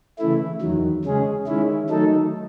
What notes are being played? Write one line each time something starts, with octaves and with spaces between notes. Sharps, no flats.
C#3 E3 A3 E4
E2 D#3 F#3
C#3 G#3 C#4 G#4
D#3 G#3 C#4 E4
D#3 F#3 A3 D#4 A4